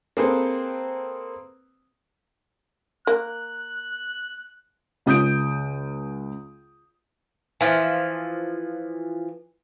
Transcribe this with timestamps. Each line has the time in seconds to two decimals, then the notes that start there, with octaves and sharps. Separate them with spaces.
0.17 A#3 C4 G#4 A4 B4 C5
3.07 A#3 F#6
5.06 C#2 D#6 G6 D7
7.61 E3 F3